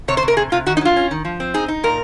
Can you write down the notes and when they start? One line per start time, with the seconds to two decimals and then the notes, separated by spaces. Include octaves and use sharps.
0.08 C3 C#5
0.17 C5
0.23 C3
0.28 A#4
0.37 C3 G#4
0.52 C3 F4
0.67 D#3 F#4
0.77 D#4
0.81 F#3 F4
0.96 C#4
1.11 D#3
1.25 F3
1.40 C4
1.54 D#4 G#4
1.68 D#4
1.84 A#2 A#4